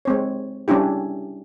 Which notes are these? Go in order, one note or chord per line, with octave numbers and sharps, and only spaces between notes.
G#3 C4 C#5
G3 C#4 D4 E4 G4